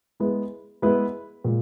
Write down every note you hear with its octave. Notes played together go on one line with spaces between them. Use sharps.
G#3 B3 E4 B4
G#3 B3 E4 B4
A#2 G#3